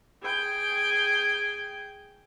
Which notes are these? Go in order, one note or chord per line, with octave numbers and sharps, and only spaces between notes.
G#4 G5